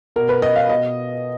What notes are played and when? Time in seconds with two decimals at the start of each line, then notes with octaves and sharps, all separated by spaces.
0.16 B2 A#4
0.29 B4
0.42 D#5
0.56 F5
0.69 B2 D#5